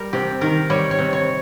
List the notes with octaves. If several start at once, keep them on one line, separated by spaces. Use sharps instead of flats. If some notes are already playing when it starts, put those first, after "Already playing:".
Already playing: G3 A#4
C3 G4
D#3 A#4
G3 C#5
C#5
C3
C#5